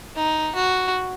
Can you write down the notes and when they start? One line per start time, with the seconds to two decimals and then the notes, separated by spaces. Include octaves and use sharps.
0.16 D#4
0.55 F#4